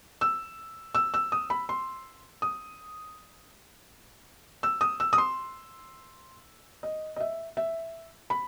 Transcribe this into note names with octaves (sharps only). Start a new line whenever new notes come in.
E6
E6
E6
D#6
B5
C6
D#6
E6
D#6
E6
D#6
C6
D#5
D#5
E5
E5
B5